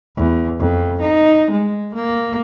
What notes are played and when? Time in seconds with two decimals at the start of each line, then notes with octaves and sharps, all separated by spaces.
0.17 E2
0.59 F2
1.01 D#4
1.51 G#3
1.95 A#3